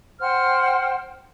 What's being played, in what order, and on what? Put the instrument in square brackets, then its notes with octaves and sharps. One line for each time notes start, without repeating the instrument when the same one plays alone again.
[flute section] C5 F#5 G5 F6